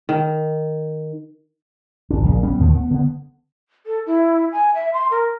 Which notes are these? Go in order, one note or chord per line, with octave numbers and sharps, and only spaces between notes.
D#3
G1 D4
A#1 C#3
G3 B3 C#4
D#2 A2 D3 D#3
B3
D3 B3
A4
E4
G#5
E5
C6
A#4